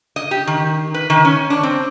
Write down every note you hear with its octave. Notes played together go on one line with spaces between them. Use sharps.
D#5
G4
D#3
B4
D#3
C#4
D4
C4